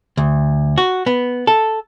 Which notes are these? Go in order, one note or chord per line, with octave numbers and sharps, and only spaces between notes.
D2
F#4
B3
A4